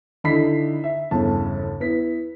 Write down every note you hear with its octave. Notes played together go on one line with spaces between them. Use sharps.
D3 D#4 E4 B5 B6 C7
E5
G1 E2 C#3 A5
B3 E4 B6